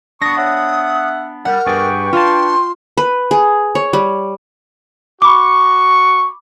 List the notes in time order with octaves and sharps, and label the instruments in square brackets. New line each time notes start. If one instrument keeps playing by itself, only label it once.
[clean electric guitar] B3 D4 [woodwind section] C#6 [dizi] D#6 [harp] A#6
[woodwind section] C#5 E5 F#5
[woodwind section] G3 [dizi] A#4 [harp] F#5
[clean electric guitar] G2 G#4 D5 [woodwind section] B4 G5 C#6
[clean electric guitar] D4 A5 [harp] F4 [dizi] C6
[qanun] B4
G#4
C#5
G3
[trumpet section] F#4 C#6 [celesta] B5 D6